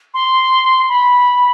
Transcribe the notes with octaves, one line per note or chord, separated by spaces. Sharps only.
C6
B5